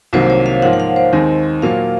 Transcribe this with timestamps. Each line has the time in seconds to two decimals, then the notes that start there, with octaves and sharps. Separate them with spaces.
0.13 C2 C3 D#3 F#3 A#3 C5
0.30 C#5
0.46 F5
0.62 G#2 F3 A#3 F4 F#5
0.73 F#5
0.80 F5
0.96 C5
1.13 D#2 D#3 G#3 C4 D#4
1.62 A#2 F#3 A#3 F4 F5